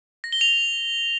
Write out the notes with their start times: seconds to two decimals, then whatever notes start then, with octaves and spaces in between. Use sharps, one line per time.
0.24 A#6
0.32 G7
0.41 F7